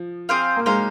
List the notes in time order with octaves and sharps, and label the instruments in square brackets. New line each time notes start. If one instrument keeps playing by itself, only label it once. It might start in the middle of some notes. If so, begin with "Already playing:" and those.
Already playing: [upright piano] F3
[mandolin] C4 G#4 C5 F5
[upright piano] A#3
[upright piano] G#3 [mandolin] D#4 C5 F5